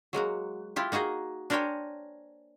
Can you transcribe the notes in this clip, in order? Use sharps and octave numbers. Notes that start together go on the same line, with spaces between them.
F#3 G#3 A#3 F#4
E4 F4 G4
A#3 D#4 F#4 G#4 D#5
D4 A#4 C5 C#5 G5 G#5